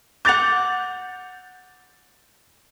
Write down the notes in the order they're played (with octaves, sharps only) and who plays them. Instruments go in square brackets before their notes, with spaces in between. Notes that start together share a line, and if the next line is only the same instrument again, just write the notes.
[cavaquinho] F#5 D6 [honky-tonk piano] G6 A6 F7